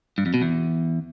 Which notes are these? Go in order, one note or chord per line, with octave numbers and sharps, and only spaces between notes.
G2
F2
B2
E2